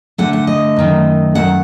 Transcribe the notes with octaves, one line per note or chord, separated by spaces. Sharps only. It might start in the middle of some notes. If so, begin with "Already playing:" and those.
D2 D3 A3 F#5
F#5
D#5
F#2 D#3 A3
F#2 D#3 A3 F#5